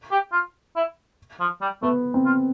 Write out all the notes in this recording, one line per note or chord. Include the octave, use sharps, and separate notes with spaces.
G4
F4
E4
F3
G3
A3 B3
C4
F4